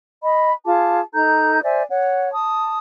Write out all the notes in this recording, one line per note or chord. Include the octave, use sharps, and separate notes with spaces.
D#5 B5
F4 G#4 A5 D6
D#4 A4 A#5 G6
C5 D5 E5 G#5
C#5 F#5
A5 D#6